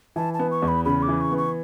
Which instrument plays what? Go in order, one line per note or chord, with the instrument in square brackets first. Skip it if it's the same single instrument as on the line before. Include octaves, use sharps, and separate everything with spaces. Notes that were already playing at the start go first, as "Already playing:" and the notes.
[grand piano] E3 [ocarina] A5
[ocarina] A5
[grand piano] B3
[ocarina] C#6
[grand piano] E2
[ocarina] B5
[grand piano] C#3 [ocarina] B5
[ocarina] D6
[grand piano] E3
[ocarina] C#6
[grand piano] B3
[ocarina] C#6